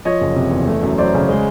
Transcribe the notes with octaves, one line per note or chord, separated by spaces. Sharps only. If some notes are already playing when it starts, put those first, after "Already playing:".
F3 C#5 D#5
F#1
C3
E2
A3
F#2
F#3 C5 D5
C#3
G#3